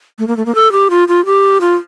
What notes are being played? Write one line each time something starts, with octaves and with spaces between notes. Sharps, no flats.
A3
A#3
A3
A#3
A4
G4
F4
F4
G4
F4